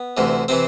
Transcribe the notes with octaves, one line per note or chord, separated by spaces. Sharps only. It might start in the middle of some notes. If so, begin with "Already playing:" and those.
Already playing: B3
D2 C3 E3
C3 E3 C4